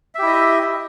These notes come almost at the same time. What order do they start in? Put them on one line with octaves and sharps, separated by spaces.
E5 G4 E4 D#5